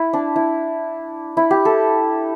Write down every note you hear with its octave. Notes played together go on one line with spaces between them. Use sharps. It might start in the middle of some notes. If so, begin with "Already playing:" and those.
Already playing: E4
D4
E4
E4
G4
A4